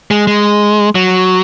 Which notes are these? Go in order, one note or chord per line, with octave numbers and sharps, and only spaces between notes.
G#3
G#3
F#3